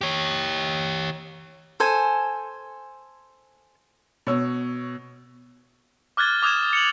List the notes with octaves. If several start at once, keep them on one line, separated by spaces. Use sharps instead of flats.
G4 C#5
A4 C5 G#5
B2 C#5 E6
D6 F6 F#6 G#6 A6 G7
D6 D#6 F#6 G#6 E7
C#7 F7 F#7